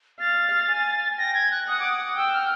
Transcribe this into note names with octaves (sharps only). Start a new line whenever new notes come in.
F5 A6
G#5
G5 A#6
G#6
F#6
F#5 D#6
D6
D#6
G5 E6
F6